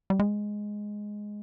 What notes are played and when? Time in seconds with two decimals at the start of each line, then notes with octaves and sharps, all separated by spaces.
0.10 G3
0.19 G#3